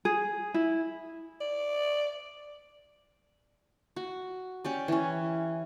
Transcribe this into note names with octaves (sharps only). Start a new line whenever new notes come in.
G#4
E4
D5
F#4
C#4 G4 D5
E3 C#4